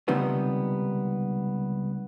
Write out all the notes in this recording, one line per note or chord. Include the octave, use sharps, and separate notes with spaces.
C#2 C3 D#3 G3 B3